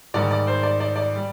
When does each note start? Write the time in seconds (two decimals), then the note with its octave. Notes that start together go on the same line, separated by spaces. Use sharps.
0.14 G#2 D#3 G3 D5
0.31 D5
0.47 C5
0.63 D5
0.80 D5
0.96 D5
1.16 G3